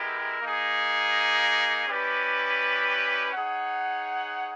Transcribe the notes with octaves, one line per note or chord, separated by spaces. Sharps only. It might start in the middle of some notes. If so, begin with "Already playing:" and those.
Already playing: G#3 B3 E4 G4 A#4
A#3 D#4 G#4
C#4 E4 G4 B4 D5
D#4 G#4 C#5 F#5